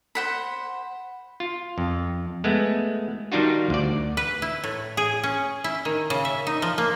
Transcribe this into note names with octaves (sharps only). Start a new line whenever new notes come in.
C5 F#5 B5
F4
F2
G#3 A3 B3
D#3 G3 D4 D#4 F4 F#4
D2 D5
B4
E4
A2
G#4
C#4
E4
D#3
C#3
E5
D#4
F3
A#3